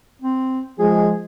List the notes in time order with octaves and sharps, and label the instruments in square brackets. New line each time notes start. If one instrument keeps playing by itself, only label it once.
[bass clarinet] C4
[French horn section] F3 G#3 [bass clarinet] G#4